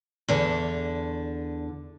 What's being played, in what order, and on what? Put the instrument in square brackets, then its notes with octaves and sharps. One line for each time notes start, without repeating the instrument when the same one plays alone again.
[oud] E2 D3